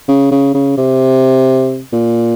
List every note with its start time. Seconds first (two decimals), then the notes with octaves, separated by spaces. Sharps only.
0.08 C#3
0.31 C#3
0.54 C#3
0.77 C3
1.93 A#2